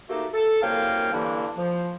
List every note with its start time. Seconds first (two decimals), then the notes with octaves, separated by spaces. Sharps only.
0.08 A3 A#3 D#4 F#4 G4 A4
0.33 A4
0.62 C2 F#2 A#3 C#5 F5 G5
1.13 G2 D3 E3 A#3 D4 E4
1.57 F3